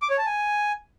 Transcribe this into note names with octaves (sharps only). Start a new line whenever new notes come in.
D6
C#5
A5
G#5